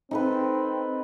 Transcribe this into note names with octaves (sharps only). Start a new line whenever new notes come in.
C4 D#4 A4 B4